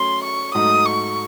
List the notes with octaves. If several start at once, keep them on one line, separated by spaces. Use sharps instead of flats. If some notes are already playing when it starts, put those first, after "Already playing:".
Already playing: F#3 A3 C#4 C6
C#6
G#2 F#3 A3 D#4 D#6
C#6